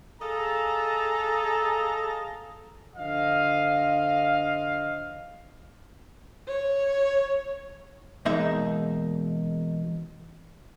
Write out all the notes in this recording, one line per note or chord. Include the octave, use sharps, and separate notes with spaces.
G#4 A4 D#5 F5 A5 A#5
D3 F3 D#5 F5
C#5
E2 B2 G#3 A#3 D#4 E5